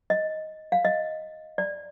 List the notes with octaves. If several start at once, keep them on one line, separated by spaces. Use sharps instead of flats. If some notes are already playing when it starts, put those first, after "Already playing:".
D#5
F5
D#5
D5